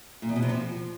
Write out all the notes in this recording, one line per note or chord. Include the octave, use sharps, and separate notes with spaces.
A#2
E2
B2
C3
F3